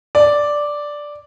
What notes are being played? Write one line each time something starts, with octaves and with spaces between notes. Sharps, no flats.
D5